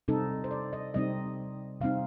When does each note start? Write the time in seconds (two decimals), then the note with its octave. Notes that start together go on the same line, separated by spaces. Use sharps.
0.08 C3 G3 C4 D#4 A4
0.44 C5
0.51 D5
0.73 D#5
0.94 C3 G3 C4 D#4 D#5
1.81 C3 G3 C4 D#4 F5